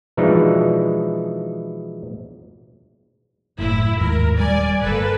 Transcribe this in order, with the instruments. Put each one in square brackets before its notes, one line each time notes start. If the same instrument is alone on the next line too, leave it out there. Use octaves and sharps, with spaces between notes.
[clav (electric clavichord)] B2 E3 F3 G#3 D4 D#4
[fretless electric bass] F#1 A2 [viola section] E4
[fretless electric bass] D#2 G#2 [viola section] A#4
[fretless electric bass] D#1 G3 [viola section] D5 G#5
[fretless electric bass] G1 [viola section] A#3 A4 B4